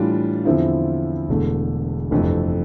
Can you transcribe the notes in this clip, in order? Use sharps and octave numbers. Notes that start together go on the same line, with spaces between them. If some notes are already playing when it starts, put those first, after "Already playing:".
Already playing: A2 E3 G3 D4 F4
E2 D3 F3 C4 E4
E1 E2 D3 A3
G1 F2 C3 E3 A3